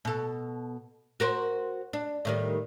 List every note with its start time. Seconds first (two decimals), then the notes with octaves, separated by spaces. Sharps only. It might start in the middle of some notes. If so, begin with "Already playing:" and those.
0.05 B2 A4
1.20 F#4 A#4 C5
1.93 D4
2.25 A2 D#3 G3